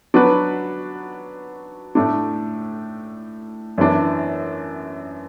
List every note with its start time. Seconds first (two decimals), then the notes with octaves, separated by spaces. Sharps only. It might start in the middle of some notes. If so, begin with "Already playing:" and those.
0.14 F#3 B3 D4 F#4 B4
1.95 A2 A3 D4
3.78 F#2 E3 D4